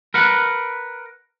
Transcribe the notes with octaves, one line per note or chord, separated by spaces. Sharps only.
A#4 B4 F#5